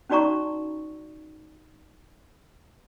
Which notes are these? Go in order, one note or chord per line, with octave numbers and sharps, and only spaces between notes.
C#4 D#4 F#4 D5 A#5 C#6